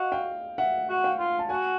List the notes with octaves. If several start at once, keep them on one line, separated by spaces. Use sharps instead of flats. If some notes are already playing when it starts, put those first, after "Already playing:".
Already playing: F#4 D#5 F5
F5 G5
E5 F#5
F#4
F5 G5
F4
A5
F#4 F#5 G#5